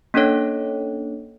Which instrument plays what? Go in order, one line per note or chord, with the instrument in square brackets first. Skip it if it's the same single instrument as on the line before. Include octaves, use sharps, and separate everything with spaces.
[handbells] A#3 C#4 D4 A4 C#5